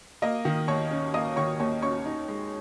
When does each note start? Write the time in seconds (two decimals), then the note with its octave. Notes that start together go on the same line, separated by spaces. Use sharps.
0.22 A#3 D#5 D#6
0.45 D#3
0.68 D#2 C#5 C#6
0.91 C#4
1.14 A#3 D#5 D#6
1.36 D#3 C#5 C#6
1.60 D#2 C#5 C#6
1.82 C#4 C#5 C#6
2.06 D#4
2.28 G#3